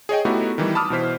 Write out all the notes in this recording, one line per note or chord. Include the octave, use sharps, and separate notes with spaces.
G#4 C#5 D#5 G5
A3 B3 D#4 E4 F#4 G4
D#3 E3 G3
A5 B5 D6 D#6 F6
B2 E3 C5 B6